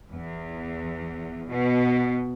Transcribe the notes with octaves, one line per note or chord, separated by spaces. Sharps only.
E2
B2